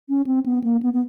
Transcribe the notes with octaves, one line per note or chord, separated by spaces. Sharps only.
C#4
C4
B3
A#3
B3
B3